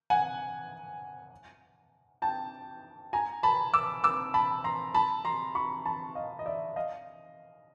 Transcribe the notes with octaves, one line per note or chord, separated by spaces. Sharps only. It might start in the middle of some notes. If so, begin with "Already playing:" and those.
F#5 G#5
G5 A5
G#5 A#5
A5 B5
D6 E6
D6 E6
A5 B5
A#5 C6
A5 B5
A#5 C6
B5 C#6
A5 B5
D#5 F5
D#5
D5 E5
D#5 F5